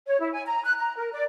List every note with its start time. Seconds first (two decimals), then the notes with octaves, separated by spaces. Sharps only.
0.07 C#5
0.20 E4
0.33 G#5
0.46 A#5
0.65 F#6
0.79 A#5
0.97 A#4
1.13 D5